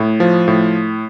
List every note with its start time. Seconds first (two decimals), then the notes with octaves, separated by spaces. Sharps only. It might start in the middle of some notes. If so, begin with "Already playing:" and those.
Already playing: A2
0.20 F3
0.48 A2